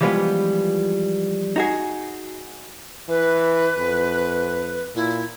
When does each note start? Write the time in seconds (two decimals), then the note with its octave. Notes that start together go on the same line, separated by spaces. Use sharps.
0.01 E3 F3 G3 G#3 B3 F4
1.56 D#4 F#4 G#4
3.09 E3 B4
3.78 F2
4.95 A#2 E4